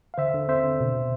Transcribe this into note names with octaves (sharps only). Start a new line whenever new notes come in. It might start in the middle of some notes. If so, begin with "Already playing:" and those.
F5
D3 C5 E5
D3
C4 C5 E5
D3
B2